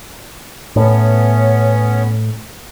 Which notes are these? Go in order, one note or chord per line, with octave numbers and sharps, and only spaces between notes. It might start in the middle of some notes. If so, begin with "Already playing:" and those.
A2 B3 C#4